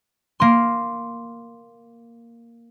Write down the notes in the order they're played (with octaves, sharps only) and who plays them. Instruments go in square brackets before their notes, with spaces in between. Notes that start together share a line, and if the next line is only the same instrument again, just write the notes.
[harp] A#3 C6